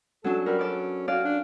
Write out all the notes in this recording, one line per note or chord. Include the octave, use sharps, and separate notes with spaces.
F#3 C#4 D4 A4
G3 F#4 A#4 B4
C#4 A4 D5 D6
C#4 F#4 D5 F5
D4